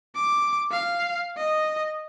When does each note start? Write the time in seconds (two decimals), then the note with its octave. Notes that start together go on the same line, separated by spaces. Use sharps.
0.16 D6
0.72 F5
1.37 D#5